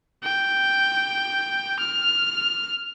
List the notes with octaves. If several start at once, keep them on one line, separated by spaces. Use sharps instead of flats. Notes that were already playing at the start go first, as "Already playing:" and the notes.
G5
F6